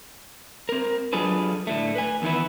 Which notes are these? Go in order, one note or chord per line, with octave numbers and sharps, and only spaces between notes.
C4 A#4
F#3 D4 F4 G#4 A4 B4
A2 D3 A3
B4 G#5
E2 D#3 E3 B3 E4